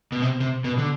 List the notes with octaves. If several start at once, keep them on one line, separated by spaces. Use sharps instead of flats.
B2
C3
C3
B2
D3